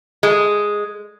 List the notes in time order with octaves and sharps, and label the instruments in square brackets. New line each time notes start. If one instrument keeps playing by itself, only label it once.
[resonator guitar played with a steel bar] G#3